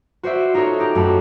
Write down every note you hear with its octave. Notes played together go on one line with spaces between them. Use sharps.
F#4 C5 D5 E5
D#4 F4 F#4 A4 C#5
D#4 G4
F#2 A3 F#4 A5 B5